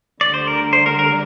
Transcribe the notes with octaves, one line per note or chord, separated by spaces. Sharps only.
D2 D3 G3 D5
C5
A#4
C5
A#4
A#4